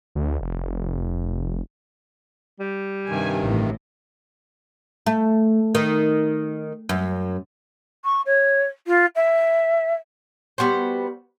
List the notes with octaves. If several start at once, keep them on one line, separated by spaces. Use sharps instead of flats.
D2
F1
G3
G2 C3 D#3 G#5
A1 A2
A3
D#3
F#2
C#6
C#5
F4
E5
G3 B3 F#4 C5